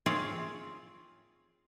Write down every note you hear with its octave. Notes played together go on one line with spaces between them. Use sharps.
C4 F4 G4 G#4 C#5 D5